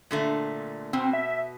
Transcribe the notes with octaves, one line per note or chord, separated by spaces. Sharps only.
A#2 D3 A3
B2 C4
E5